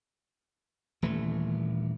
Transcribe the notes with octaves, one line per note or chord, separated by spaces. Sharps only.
D#1 E3 A3